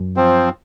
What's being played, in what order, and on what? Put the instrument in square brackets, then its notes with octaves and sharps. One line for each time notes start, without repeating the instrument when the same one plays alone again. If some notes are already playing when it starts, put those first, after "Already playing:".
Already playing: [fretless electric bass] F#2
[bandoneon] F3 C4